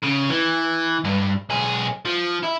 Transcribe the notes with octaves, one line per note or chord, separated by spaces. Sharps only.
C#3
E3
G2
B1 G#4
F3
E4